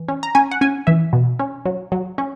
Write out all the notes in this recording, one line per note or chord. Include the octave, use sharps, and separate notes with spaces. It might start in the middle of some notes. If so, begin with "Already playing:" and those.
Already playing: E3
C#4
A#5
C#4 G#5
F#5
C#4 G#5
E3 E5
B2
C#4
F#3
F#3
C#4